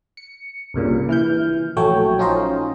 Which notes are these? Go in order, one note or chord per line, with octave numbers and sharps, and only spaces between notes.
C#7
C2 G2 A#2 C#3
E3 F6 G6
A#1 F#3 A3 C#5 G5
C#4 D#4 F4 C5 D#5